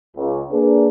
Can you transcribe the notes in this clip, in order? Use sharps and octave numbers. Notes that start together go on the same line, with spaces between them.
C#2
A#3 D4 G#4 B4